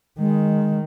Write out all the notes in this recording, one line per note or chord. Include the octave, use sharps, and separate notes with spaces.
D#3 G#3